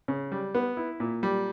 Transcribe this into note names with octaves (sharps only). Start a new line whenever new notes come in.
C#3
G3
B3
E4
A#2
G3